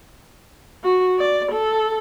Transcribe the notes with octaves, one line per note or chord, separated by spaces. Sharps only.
F#4
D5
A4